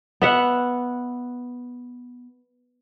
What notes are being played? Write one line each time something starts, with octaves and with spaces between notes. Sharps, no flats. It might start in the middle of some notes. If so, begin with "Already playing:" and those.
B3 E5 F#5